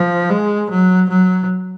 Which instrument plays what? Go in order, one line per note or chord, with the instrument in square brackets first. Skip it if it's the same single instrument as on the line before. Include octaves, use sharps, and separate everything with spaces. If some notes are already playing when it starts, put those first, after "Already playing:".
Already playing: [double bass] F3
G#3
F#3
F#3